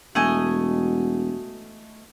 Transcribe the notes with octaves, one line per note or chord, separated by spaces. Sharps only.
E1 A3 F#4 D#5 G#5